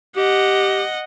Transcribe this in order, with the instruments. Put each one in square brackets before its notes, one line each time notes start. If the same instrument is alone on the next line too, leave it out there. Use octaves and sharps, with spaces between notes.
[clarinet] G4 [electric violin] D#5 F#5